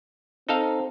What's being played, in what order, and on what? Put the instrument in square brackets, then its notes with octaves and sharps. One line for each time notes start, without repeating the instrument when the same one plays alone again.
[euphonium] C4 [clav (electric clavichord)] D#4 A4 F5